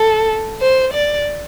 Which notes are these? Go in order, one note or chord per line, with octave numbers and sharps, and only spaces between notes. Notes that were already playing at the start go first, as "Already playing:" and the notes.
Already playing: A4
C5
D5